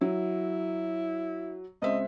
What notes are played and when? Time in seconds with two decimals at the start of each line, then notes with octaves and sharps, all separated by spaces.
0.01 F#3 E4
1.82 C#2 C4 D#5 E5